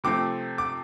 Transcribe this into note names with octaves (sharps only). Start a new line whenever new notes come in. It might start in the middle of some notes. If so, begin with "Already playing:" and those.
C3 F3 A3 C4 D6
D6